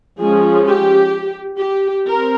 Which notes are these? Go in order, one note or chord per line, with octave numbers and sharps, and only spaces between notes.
F3 G#3 C#4 G#4
G4
G4
C4 A#4